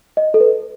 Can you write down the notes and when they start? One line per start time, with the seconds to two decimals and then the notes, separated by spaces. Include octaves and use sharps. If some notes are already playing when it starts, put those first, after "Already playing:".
0.17 D#5
0.34 A4
0.40 B4